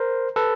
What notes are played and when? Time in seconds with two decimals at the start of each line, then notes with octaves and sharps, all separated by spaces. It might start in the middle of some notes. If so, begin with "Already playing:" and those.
Already playing: A#4 C5
0.36 A4 B4